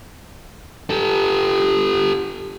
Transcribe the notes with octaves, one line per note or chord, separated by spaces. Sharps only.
G4 A4